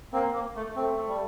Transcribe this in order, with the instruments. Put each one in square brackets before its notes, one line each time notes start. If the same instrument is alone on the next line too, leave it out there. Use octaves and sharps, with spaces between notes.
[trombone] A#3 [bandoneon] C4
[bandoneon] A#3
A3
[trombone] A3 [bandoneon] C4
[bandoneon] G3